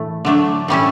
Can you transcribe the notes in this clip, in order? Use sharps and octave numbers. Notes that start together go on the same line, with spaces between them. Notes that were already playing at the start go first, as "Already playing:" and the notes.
Already playing: A2 E3 A3
D3 F#3 A3 D4
A2 G3 C#4 E4